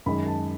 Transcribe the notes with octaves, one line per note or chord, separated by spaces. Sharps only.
F#2 D#3 G#3 B5
A5